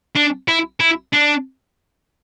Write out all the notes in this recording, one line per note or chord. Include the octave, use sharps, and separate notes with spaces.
D4
E4
E4
D4